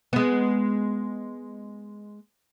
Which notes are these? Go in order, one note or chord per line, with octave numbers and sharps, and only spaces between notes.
G#3 B3